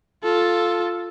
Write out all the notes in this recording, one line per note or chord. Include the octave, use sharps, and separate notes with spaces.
F4 A4